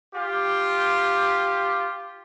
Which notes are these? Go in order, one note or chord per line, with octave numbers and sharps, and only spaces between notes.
F4 G4